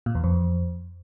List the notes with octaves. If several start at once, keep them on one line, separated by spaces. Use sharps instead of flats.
A#2
E2
F2